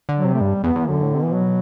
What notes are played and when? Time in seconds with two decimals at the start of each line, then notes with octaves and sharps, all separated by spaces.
0.09 D3
0.18 F#3
0.24 C3
0.34 A3
0.41 G2 G3
0.64 E2 B3
0.76 E2
0.87 F#2 D3
1.03 A2
1.15 C3
1.19 B2 E3
1.34 F#3